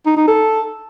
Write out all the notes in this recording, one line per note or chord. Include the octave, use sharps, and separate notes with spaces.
D#4
D#4
A4